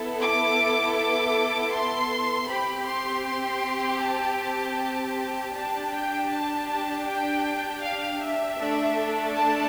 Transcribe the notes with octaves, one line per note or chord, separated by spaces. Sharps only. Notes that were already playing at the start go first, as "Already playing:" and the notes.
Already playing: B3 E4 A4
D6
D6
C6
C4 G4 B5
C6
C6
A5
A5
D4 G4 A5
G5
A5
A5
G5
F5
E5
A3 D4 A4
A5